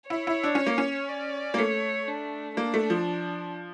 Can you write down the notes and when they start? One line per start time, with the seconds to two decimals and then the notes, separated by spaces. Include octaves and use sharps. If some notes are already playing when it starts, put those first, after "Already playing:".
0.10 E4 C#5
0.27 E4
0.43 D4
0.55 C#4
0.67 A#3
0.78 C#4
1.09 D5
1.54 A#3
1.58 A3 C#5
2.08 D4
2.57 A#3 D4
2.74 A3
2.90 F3